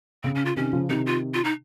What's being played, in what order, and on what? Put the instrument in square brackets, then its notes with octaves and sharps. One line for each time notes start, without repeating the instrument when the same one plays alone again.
[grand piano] C#3 [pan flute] C4
[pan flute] C#4
F4
[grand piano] C3 D#3 [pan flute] C#4
[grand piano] C#3 F3
[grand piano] C3 D#3 [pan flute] D#4
[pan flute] F4
F4
D#4